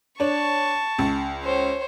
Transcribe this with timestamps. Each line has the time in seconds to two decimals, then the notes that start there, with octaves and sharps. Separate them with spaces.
0.20 D4 C#5 A5 C#6
0.99 C#2
1.43 C5 C#5